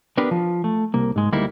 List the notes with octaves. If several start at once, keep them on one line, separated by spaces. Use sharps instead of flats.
B3 D4 G4 A#4 B4
F3
A3
C2 A#3
G#2 G#3
D2 G3 A#3 D#4 E4